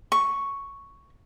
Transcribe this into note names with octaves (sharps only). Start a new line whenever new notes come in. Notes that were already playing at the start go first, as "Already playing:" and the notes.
C#6